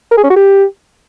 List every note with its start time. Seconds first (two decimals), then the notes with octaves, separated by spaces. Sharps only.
0.11 A#4
0.18 G#4
0.24 C#4
0.30 F#4
0.36 G4